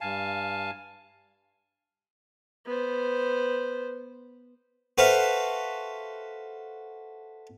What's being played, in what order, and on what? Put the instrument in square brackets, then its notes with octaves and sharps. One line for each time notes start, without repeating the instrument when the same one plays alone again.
[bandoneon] G2 F5 G#5 A5
[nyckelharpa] B3 C5
[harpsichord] F#4 A4 B4 C5 E5 F5